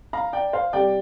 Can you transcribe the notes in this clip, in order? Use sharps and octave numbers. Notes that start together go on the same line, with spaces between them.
F5 A#5
D5 G5
C5 F5
C3 G3 D5 G5